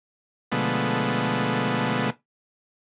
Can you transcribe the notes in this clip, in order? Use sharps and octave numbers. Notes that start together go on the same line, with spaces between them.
B2 D3 F3 G#3 A3 B3